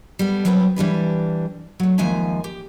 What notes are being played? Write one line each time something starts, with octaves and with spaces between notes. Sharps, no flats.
G3 B3 A4
F#3 G3 B3 C4 A4 B4
E3 G3 D4 B4
F#3 A3
D#2 F3 G#3 E5 G#5 A#5
G4